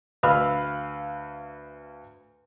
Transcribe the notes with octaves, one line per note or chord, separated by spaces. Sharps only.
D2 B4 F5 B5 E6 F6